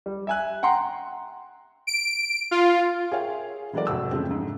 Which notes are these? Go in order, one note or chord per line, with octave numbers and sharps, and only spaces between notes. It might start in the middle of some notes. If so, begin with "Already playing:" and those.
G3
E5 G#5 F#6
F#5 G5 A#5 C6
D7
F4
G#4 A#4 C#5 E5 F5 G5
E3 F#3 G#3 A3 A#4 D5
F2 C3 F#4 E6
C#3 F3 G#3 A3 C4
G#2 C#3